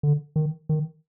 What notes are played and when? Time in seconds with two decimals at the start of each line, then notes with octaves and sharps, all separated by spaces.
0.03 D3
0.36 D#3
0.69 D#3